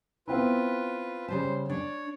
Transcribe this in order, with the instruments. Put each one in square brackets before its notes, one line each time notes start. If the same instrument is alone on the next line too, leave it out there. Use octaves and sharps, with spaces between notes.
[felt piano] B3 C4 E4 [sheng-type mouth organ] F4 B4
[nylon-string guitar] C#3 G3 A5 [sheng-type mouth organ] C5
[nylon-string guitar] D4 [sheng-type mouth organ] C#5